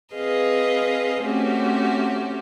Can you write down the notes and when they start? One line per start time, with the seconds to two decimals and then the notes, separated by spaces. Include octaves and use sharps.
0.15 C4 G#4 B4 D#5 F5
1.23 A3 C4 C#4 F#4 G4